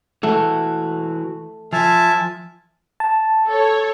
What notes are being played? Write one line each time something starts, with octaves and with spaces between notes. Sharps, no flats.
E3 A3 F#4
F3 E5 G#5 A5
A5
A4 C#5